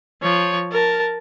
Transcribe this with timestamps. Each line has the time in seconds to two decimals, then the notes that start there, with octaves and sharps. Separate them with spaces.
0.22 F3 C#5
0.72 A#4 A5